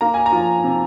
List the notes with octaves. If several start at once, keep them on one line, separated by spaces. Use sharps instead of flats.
A#3 A#5
G#5
A#5
F3
C3